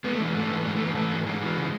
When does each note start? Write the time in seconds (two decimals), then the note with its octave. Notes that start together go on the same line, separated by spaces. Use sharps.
0.04 G#3 B3
0.15 A3
0.20 E3 G#3
0.34 G#2 A3
0.50 E3
0.65 G#2 G#3
0.76 A3
0.81 E3
0.86 A#3
0.95 E3 A3
1.11 G#2
1.26 E3 G#3
1.41 E3
1.57 C#3